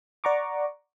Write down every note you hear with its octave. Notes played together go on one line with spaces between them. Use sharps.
D5 F#5 A#5 C#6 D6